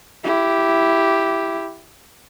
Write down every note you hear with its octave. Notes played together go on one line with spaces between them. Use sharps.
E4 G4